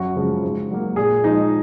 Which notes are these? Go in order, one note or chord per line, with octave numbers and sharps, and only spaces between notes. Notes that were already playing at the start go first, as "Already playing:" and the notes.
Already playing: F#2 F#4
C#3 F3 G#3
G#2
F#3 A#3
A#2 G#4
F3 G#3 D#4